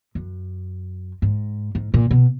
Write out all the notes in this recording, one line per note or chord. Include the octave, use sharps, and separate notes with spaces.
F#2
G#2
G#2
A#2
B2